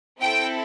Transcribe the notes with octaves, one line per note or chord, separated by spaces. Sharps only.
C4 E4 A4 G5